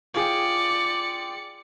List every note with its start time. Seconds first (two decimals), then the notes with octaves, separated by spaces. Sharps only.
0.14 F4 G#4 D5 G5 C#7